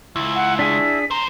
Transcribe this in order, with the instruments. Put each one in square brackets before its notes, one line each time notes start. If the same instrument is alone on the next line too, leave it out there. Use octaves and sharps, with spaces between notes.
[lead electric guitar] C#2 [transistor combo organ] E4
[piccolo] F#5
[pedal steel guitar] D4 G#4 [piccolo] B6
[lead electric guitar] D3 C5 [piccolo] A#5